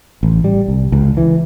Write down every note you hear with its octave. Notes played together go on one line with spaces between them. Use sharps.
A1
G3
C2
C#2
E3